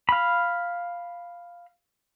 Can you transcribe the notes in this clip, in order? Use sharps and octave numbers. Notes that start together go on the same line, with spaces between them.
F5 B5